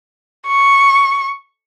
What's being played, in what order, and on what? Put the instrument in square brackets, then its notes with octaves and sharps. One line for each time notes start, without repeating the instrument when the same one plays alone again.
[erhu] C#6